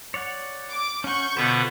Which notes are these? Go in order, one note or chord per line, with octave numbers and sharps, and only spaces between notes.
C#5 D5 F#5
D6
C#4 F#5 C#6 G6
B2 D3 B3 F4 B4 C5